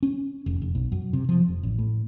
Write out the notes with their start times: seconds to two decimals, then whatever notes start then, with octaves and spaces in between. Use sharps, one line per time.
0.03 C#4
0.46 F1
0.62 F1
0.75 B1
0.92 F#2
1.13 C3
1.29 F3
1.48 F1
1.63 A1
1.78 A2